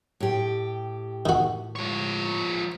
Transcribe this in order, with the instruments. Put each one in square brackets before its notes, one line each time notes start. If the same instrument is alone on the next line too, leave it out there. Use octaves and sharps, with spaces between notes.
[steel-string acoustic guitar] A2 G4
[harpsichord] D#3 F#4
[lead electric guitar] F3 C#5